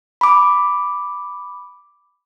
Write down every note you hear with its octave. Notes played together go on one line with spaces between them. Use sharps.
B5 D6